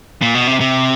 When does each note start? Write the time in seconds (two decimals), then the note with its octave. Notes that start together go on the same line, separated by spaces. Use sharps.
0.22 A#2
0.35 B2
0.47 C3
0.60 C3